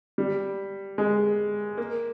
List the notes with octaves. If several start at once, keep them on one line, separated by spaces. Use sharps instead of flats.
G3
G#3
A#3